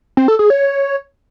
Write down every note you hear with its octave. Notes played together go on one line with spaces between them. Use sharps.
C4
A4
G#4
C#5